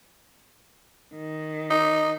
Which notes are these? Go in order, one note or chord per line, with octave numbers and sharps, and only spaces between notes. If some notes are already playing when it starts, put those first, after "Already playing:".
D#3
D#4